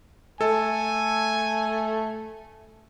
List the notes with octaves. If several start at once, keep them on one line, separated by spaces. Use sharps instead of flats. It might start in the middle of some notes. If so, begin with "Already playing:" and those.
A3 A4 G#5